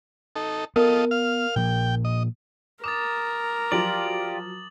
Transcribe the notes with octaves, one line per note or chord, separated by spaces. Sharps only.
D#4 A4
B3 F4 A4 A#4 D#5
F5 F6
A#2 F3 G5
D#5
A#4 D6 D#6 A6 E7
F3 F#3 F4 G4 D5 F#7